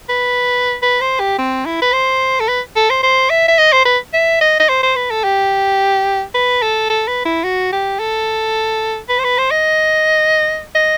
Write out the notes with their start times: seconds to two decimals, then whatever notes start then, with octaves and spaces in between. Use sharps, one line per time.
0.09 B4
0.83 B4
1.01 C5
1.20 G4
1.38 C4
1.66 E4
1.82 B4
1.93 C5
2.40 A4
2.48 B4
2.76 A4
2.90 C5
3.03 C5
3.30 E5
3.48 E5
3.58 D#5
3.73 C5
3.85 B4
4.13 E5
4.41 D#5
4.60 D#5
4.69 C5
4.83 C5
4.96 B4
5.10 A4
5.24 G4
6.34 B4
6.62 A4
6.90 A4
7.08 B4
7.26 E4
7.44 F#4
7.73 G4
8.00 A4
9.09 B4
9.19 C5
9.24 B4
9.38 C5
9.51 D#5
10.75 D#5